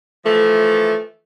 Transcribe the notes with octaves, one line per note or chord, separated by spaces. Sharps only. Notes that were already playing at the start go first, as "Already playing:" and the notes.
E3 F3 A3